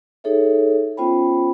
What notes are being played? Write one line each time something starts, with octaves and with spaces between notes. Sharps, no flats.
D#4 G#4 A4 C#5 E5
B3 C#4 F4 C5 G5 B5